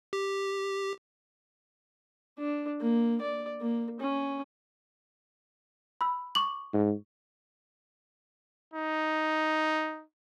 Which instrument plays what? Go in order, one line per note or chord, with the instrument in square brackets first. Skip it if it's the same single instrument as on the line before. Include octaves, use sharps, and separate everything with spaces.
[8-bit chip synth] G4
[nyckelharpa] D4
A#3
D5
A#3
C#4
[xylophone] B5 E6
C#6 D6 F#7
[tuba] G#2
[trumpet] D#4